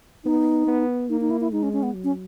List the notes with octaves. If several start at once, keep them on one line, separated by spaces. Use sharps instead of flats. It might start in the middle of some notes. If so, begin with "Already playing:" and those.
B3 D#4
B3
A#3 D#4
D#4
E4
E4
G#3 D#4
C#4
C#4
B3
F#3
C#4